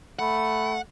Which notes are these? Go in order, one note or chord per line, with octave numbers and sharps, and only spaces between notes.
A3 F#5 B5